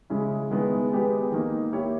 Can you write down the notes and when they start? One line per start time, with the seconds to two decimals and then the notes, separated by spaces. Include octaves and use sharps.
0.10 C#3 G#3 C#4 E4
0.51 D#3 G#3 B3 E4
0.91 G#3 B3 G4 B4
1.32 D#3 A#3 D#4
1.72 A#3 E4 G4 C#5